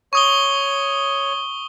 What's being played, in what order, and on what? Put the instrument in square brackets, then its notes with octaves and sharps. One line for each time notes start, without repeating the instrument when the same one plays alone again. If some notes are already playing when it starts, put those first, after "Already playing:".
[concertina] C#5 [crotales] C#6 D#6 G7